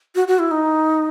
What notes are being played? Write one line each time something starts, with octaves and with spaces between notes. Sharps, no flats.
F#4
F#4
E4
D#4